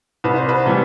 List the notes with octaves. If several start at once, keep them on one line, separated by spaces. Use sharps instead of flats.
C2 B4
C5
B4
C3 E3 G3